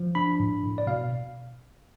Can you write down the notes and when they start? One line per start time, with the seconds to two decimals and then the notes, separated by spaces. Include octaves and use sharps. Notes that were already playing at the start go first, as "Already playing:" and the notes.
Already playing: F3
0.15 D4 B5
0.40 A2
0.63 A2
0.78 D5
0.87 B2 F5